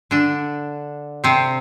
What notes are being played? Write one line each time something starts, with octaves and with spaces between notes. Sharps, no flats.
D3 D4
C3 C4